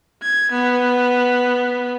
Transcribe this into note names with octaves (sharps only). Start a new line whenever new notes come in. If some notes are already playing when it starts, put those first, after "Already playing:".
G#6
B3